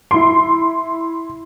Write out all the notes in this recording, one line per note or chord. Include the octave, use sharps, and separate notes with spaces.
E4 C6